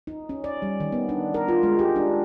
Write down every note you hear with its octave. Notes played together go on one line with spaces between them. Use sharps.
D#4
C#4
D5
G3
D#3
B3
D4
A#4
F4
G#3
G4
D4